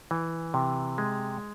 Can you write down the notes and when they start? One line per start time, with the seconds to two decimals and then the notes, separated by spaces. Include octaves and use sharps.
0.11 E3
0.54 C3
0.98 G#3